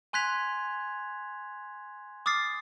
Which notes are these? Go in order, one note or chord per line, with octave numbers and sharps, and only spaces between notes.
G#5 C6 F#6 G#6 B6 F7
D6 D#6 F6 A6 C7